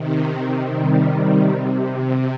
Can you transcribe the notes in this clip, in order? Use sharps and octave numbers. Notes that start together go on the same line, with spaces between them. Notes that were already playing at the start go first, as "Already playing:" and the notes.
Already playing: C3 D#3
D#3 G3
C3
C3